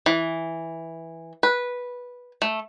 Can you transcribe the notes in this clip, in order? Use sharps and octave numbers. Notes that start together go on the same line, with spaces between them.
E3
B4
A3